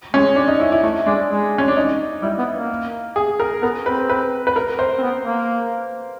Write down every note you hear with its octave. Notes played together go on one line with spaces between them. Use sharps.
G#3 C#4
D4
D#4
E4
E4
A3 E4
G#3 D4
G#3
C#4
D4
D#4
G3 E4
B3
A#3
G#4
A#4
B3 A#4
C4 B4
B4
B4
A#4
C5
C4
B3
A#3